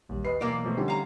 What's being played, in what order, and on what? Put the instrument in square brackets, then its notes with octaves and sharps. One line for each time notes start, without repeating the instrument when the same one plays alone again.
[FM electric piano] A#1 G3 [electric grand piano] D#2
[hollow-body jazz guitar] D#2 [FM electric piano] B4 D#5 [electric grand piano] C7
[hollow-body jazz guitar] B1 A#3 D5 [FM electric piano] E3
[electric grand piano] B2 F3 A3
[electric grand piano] D3 G3 C#4 [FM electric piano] F3 D#4 G4
[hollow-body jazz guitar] F5 A#5